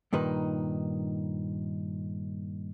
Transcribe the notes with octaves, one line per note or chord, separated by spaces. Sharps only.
G2 A#2 D#3 D#4 B4